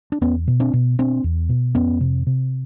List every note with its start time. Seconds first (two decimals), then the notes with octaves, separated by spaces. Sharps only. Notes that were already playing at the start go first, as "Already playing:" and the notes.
0.12 D4
0.21 E2 B3 C#4
0.48 B2
0.60 C4 D4
0.73 B2
0.98 B2 C4 D4
1.24 E2
1.49 B2
1.75 F2 B3 C#4
2.01 C3
2.27 C3